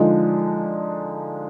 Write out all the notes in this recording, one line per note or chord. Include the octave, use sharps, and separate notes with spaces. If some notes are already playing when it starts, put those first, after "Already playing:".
Already playing: D3 F3 G#3 D#4